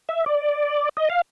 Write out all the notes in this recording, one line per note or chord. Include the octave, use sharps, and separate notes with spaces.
E5
D5
D#5
F5